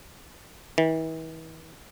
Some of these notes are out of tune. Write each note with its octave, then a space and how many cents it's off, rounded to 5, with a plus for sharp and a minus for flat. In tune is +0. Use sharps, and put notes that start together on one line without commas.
E3 -40